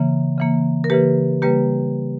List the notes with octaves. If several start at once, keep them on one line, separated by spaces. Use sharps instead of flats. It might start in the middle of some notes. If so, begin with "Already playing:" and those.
Already playing: C#3 E3 A#3
C#3 E3 A#3
A#4
C#3 E3 A#3 G4 B4
C#3 G3 A#3 G4 B4